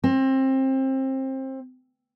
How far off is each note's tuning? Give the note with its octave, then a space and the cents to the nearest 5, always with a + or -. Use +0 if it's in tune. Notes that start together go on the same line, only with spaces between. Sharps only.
C4 +25